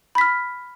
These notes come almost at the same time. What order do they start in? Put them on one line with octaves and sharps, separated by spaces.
B5 B6 F6